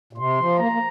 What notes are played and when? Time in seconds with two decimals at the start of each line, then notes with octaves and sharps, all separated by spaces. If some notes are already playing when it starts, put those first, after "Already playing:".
0.13 A#2
0.18 C3 C6
0.39 F3
0.58 A#3 A#5
0.72 A#3